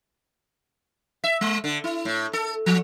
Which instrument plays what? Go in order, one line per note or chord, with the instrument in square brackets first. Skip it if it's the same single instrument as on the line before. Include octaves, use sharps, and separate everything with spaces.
[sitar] E5
G#3
D3
E4
A2
A4
F3